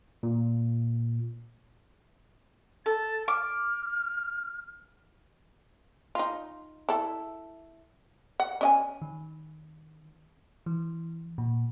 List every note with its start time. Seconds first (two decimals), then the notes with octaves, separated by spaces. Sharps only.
0.23 A#2
2.86 A4 A6
3.28 D6 F6
6.15 D#4 F4
6.89 E4 A4
8.40 F#5
8.61 C#4 D#5 G#5
9.02 D#3
10.66 E3
11.38 A#2